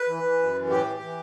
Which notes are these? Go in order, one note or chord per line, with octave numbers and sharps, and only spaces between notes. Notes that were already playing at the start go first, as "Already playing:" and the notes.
Already playing: B4
E3
E3
F#2
E3
A2 G4
E3
E3